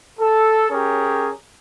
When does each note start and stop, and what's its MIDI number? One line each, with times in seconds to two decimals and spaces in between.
0.20 0.67 69
0.70 1.30 61
0.70 1.30 67
0.70 1.30 68
0.70 1.30 70